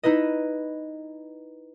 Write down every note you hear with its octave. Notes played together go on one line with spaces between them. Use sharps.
D#4 E4 B4 D#5